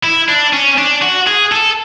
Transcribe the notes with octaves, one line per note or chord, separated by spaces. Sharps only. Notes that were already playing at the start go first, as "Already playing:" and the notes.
E4
D4
C#4
D4
F#4
G#4
A4